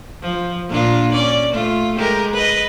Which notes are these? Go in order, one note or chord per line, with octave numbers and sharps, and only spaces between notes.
F3
A#2 D4 F4
C#4 D5
A3 F4
G#3 G4 A#4
B4 D#5